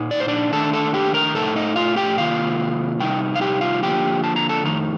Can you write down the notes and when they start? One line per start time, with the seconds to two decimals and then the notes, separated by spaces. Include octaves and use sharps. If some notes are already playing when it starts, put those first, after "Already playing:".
Already playing: A#2 D#4
0.11 D5
0.20 C5
0.28 D4 D5
0.52 D#3 A3 D4 A4 A5
0.73 A4 A5
0.94 G4 G5
1.14 A#4 A#5
1.35 A2 A3 D#4 A4 A5
1.56 D#4 D#5
1.76 F4 F5
1.96 G4 G5
2.17 C3 D#3 A#3 F4 F5
2.99 C3 G3 D#4 G5
3.36 F5
3.41 G4 G5
3.61 F4 F5
3.83 D3 F3 A#3 F4 G4 G5
4.24 A5
4.36 A#5
4.49 A4 A5
4.64 F2 D#3 A3 D#4 A#5